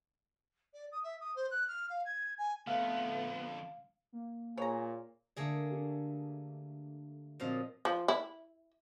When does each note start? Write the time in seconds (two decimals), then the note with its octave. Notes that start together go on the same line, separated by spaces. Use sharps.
0.73 D5
0.92 D#6
1.03 E5
1.20 D#6
1.35 C5
1.51 F#6
1.67 F6
1.89 F5
2.05 G#6
2.38 G#5
2.67 F2 D3 A3 B3 F5
4.12 A#3
4.58 A#2 G#4 C#5 A#5
5.37 D3 A3 A#3 G#4 D5
5.71 D4 G4
7.40 A#2 F3 F#3 C4 D#5 F5
7.85 F3
8.08 E4